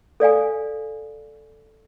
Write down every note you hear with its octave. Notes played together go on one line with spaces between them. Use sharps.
A4 D5 F5 G#5